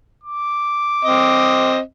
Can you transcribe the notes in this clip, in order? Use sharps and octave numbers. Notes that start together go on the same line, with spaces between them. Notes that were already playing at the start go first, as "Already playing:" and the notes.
D6
C4 D#5